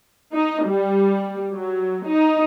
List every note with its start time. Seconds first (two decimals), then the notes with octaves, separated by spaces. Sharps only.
0.33 D#4
0.65 G3
1.53 F#3
2.06 D#4